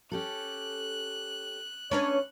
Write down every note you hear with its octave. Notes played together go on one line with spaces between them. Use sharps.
C#4 G4 A4 F#6
C#4 D4 B4 C#5